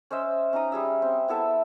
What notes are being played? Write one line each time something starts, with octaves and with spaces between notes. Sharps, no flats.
C#4 C5 D#5 E5
C#4 D#4 A#5 D#6
G3 G#4 E5
C4
B3 E4 A4 E5